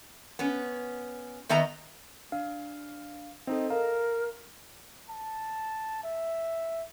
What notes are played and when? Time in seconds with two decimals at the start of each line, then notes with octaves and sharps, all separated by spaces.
0.39 B3 C#4
1.49 D#3 B3 D#5 E5 A#5
2.32 D4 F5
3.47 C4 D#4 A4 D#5
3.70 A#4 F5 A#5
5.09 A5
6.03 E5